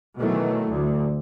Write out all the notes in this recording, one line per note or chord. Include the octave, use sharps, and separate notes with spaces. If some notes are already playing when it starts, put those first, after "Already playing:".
B2 D#3 E3 F#3 A3
D2 D3